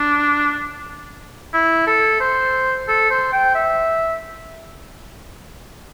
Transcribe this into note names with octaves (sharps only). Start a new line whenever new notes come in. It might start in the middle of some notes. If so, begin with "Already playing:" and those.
Already playing: D4
E4
A4
C5
A4
C5
G5
E5